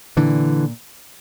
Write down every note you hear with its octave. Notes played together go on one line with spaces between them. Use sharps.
A#2 D3 E3